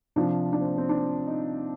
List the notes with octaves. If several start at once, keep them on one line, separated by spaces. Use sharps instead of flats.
C3 F3 D4
D4
C4
C4
D4
D#4